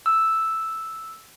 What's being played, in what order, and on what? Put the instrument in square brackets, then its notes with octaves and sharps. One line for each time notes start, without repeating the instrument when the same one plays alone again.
[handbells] E6